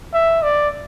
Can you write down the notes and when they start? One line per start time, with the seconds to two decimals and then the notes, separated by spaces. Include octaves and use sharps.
0.14 E5
0.43 D5